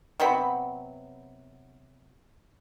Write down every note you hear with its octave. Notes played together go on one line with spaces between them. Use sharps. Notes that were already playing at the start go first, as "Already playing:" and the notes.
C3 F#3 B3 B5